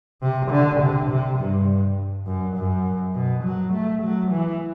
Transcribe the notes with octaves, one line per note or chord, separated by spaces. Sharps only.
C3
D3
C3
C3
G2
F#2
F#2
B2
F#3
A3
F#3
E3